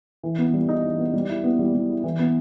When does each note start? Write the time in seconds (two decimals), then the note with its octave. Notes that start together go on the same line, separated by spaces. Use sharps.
0.23 E3
0.38 B3
0.54 G3
0.69 D#4
0.84 E3
0.99 B3
1.14 G3
1.29 E4
1.44 B3
1.59 G3
1.74 G3
1.90 E4
2.04 E3
2.19 B3